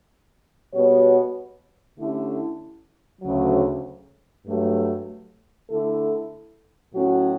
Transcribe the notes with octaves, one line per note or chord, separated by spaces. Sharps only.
B2 G3 B3 F#4 C#5
D3 A3 C#4 E4 G4
D2 C#3 F#3
G2 F#3 A3
D3 A3 E4 A4
A2 F#3 C#4 F#4